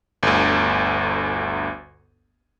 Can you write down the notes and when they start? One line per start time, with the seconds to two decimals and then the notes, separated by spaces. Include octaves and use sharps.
0.23 G1 D2